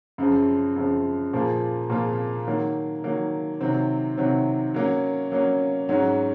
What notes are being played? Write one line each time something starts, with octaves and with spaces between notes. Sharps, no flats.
F#2 C#3 F3
F#2 C#3 F3
A#2 F3 A#3 F4 G#4
A#2 F3 A#3 F4 G#4
D#3 F#3 A#3
D#3 F#3 A#3
C3 D#3 F#3 C4
C3 D#3 F#3 C4
F#3 A#3 C#4
F#3 A#3 C#4
G#2 F#3 C#4 F#4